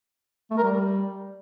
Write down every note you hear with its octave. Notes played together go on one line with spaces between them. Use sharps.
A3
A#4
G3